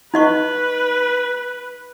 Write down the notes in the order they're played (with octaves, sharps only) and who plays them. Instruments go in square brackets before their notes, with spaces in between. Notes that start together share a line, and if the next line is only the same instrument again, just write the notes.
[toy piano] D#4 D#5 C#6 [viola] B4